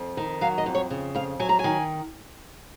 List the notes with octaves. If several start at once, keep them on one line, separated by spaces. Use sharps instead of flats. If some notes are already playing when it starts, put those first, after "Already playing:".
Already playing: F2
D#3
F#3 F5
D#5
F2
C#5
C#3
F2 F5
F#3 G#5
A#5
G#5
D#3